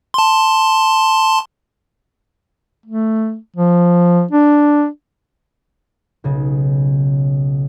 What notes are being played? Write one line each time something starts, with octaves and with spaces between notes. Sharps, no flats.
A5 C6
A3
F3
D4
B1 C#3